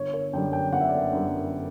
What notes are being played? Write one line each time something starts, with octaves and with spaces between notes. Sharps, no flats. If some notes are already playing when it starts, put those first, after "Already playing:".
Already playing: G1 C#5
C#5
F#2 D3 G3 G5
G5
G1 F#5
E5
D5
E5
F#2 D3 G3